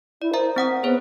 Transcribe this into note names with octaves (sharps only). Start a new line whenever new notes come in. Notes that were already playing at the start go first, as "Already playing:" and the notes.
E4 D5
A#4 C5 E5 A#5
C4 F#5 D#6
B3 G#4 C5 C#5